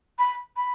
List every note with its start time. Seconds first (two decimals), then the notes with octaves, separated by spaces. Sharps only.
0.19 B5
0.57 B5